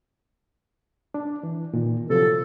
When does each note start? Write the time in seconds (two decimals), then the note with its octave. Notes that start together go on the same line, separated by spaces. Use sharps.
1.14 D4
1.43 E3
1.74 A#2 D#3
2.10 C3 F3 F#3 A4